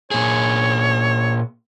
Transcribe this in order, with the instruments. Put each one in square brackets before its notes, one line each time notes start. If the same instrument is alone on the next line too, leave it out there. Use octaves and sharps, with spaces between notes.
[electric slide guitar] A#2 G#4 [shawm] C#5